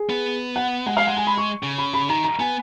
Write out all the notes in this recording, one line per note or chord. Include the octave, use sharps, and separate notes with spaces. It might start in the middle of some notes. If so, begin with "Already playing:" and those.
Already playing: G#4
B3
F#5
G#3 F#5
F5
F#5
G#5
B5
C#6
C#3
B5
B5
D#3 A#5
A#5
B3 G#5